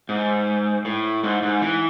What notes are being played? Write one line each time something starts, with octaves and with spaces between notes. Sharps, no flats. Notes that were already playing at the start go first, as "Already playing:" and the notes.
G#2
A2
G#2
G#2
E3